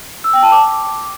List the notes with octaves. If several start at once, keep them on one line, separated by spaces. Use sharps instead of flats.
E6
G5
A5
D6